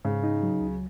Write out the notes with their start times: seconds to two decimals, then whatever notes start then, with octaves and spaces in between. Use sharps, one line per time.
0.05 G#2 C#3
0.23 D#4
0.43 F#3
0.61 C#2